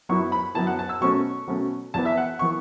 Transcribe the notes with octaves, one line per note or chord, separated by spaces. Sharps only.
F#2 F#3 B3 E4 C#6
B5
F#2 F#3 B3 E4 A5
F#5
A5
E6
B2 F#3 A3 C#4 C#6
B2 F#3 A3 C#4
E2 E3 B3 A5
E5
F#5
E3 B3 C#6